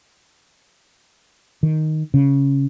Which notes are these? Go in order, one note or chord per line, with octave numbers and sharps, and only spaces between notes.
D#3
C#3